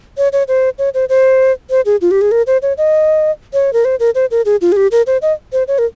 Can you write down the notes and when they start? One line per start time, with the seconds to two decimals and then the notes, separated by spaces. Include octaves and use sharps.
0.18 C#5
0.33 C#5
0.48 C5
0.79 C#5
0.94 C5
1.09 C5
1.70 C5
1.86 G#4
2.01 F4
2.11 G4
2.21 G#4
2.32 A#4
2.47 C5
2.62 C#5
2.78 D#5
3.53 C#5
3.73 A#4
3.85 C5
4.00 A#4
4.15 C5
4.31 A#4
4.45 G#4
4.61 F4
4.72 G#4
4.77 G4
4.91 A#4
5.07 C5
5.22 D#5
5.53 C5
5.68 C#5
5.79 A#4